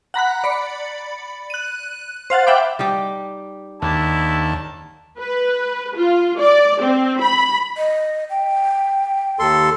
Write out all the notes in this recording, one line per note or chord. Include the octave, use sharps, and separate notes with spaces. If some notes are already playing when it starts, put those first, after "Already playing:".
F#5 A#5 B5 F#6
D5 B5 C#7
F#6 D#7
C5 F5 F#5 A6
E5 F#5 G5 B5 D6
G3 D#4 G4
D#2 D4 E4 A5
B4
F4
D5
C4
B5
D#5
G5
D#2 A4 C6